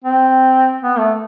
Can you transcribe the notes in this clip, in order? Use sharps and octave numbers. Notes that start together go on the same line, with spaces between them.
C4
B3
A3